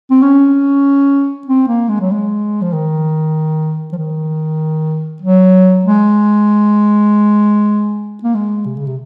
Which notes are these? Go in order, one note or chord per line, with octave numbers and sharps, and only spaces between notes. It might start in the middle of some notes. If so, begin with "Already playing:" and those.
C4
C#4
C4
A#3
G#3
F#3
G#3
F3
D#3
F3
D#3
F#3
G#3
A#3
G#3
C3
C#3
C3